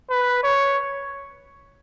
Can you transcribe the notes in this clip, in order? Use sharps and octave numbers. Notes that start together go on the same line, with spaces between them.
B4
C#5